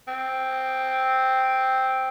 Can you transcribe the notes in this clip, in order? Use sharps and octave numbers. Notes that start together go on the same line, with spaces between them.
C4